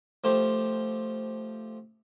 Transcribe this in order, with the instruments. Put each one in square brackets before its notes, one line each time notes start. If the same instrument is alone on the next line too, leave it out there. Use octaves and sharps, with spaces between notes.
[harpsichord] F3 A3 G4 C5